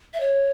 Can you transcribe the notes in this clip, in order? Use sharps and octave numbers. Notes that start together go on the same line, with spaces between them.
E5
C#5